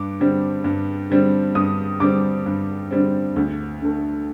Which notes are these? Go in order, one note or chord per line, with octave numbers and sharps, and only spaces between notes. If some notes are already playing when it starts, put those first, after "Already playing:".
Already playing: G2 D6
D3 G3 C4
G2
D3 G3 C4
G2 D#6
D3 G3 C4 D6
G2
D3 G3 C4
D2
D3 A3